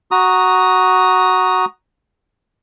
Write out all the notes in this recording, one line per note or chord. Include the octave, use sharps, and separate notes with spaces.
F#4 A#5 D#6